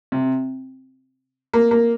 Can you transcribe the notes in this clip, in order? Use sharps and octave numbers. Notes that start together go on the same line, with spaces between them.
C3
A#3
A#3